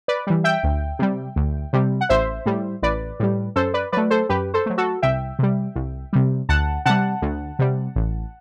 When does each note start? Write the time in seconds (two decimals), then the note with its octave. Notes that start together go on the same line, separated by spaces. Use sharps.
0.08 B4 D5
0.27 E3 G3
0.44 E5 G5
0.63 D2
0.99 C3 G3
1.36 D2
1.73 C3 G3
2.01 F#5
2.09 A1 C5 E5
2.46 A2 G3
2.82 A1 B4 D5
3.20 A2 G3
3.56 F#2 A4 C5
3.74 B4 D5
3.92 F#3 A3 B4 D5
4.10 A4 C5
4.29 F#2 G4 B4
4.54 A4 C5
4.66 F#3 A3
4.78 F#4 A4
5.02 C2 E5 G5
5.39 C3 G3
5.75 C2
6.13 C3 G3
6.49 D2 F#5 A5
6.86 C3 G3 F#5 A5
7.22 D2
7.59 C3 G3
7.96 A1